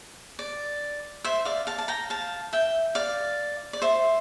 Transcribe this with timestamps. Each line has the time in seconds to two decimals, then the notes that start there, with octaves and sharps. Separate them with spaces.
0.39 D5
1.24 C5 E5
1.45 D5 F5
1.67 F5 A5
1.79 A5
1.88 G5 A#5
2.10 F5 A5
2.53 E5 G5
2.95 D5 F5
3.73 D5
3.82 C5 E5